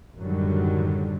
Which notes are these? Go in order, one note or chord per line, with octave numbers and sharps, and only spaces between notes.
F#2 A2 D3 D#3 F#3 G3